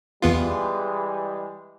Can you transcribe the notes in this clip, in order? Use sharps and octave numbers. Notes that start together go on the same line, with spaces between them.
E2 E3 G3 G#3 B3 F4